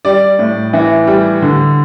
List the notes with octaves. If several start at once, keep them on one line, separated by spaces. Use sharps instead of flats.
G3 D5
A2
E3
G3
D3